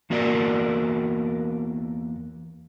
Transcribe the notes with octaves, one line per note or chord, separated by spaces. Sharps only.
E2 A#3 F#4 A#4 D5